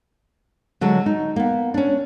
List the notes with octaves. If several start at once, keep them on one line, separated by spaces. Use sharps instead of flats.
D3 F#3 G#3
D#4
A#3 B3
C#4 D4